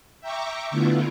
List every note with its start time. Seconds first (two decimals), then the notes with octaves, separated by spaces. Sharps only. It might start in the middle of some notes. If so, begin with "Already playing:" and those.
0.21 E5 G5 A#5 C#6 D6
0.71 D3 A3 B3 E4 F4